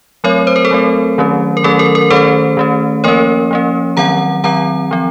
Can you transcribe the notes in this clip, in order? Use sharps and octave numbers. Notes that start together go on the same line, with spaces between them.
F#3 A3 C4 A#4 C#5
C5
A#4
A4 C5
F#3 A3 C4
D#3 F#3 A3 C#4
A#4
D#3 F#3 A3 C#4 A4
A#4
A#4
D#3 A3 C#4 A4 C5
D#3 A3 C#4
F3 A#3 C#4 A#4 C#5
F3 A#3 C#4
D#3 F#3 C4 F#5 A#5
D#3 F#3 C4 F#5 A#5
F3 C4